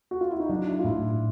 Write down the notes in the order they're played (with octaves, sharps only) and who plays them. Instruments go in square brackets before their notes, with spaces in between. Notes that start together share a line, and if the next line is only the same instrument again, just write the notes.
[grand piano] F#4
F4
E4
D#4
[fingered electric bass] F#3 [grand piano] D4
[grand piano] E4
F4
[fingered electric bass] A2 [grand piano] E4